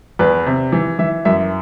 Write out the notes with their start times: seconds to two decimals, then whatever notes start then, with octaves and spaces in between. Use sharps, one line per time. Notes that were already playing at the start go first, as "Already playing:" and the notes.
0.19 E2 B4
0.46 C3
0.72 E3
0.99 E3 E5
1.25 F#2 E5